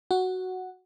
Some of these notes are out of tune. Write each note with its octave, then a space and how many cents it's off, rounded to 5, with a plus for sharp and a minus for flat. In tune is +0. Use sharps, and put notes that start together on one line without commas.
F#4 +0 F#5 +0